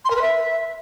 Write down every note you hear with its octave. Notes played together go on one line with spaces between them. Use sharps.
C6
A#4
B4
E5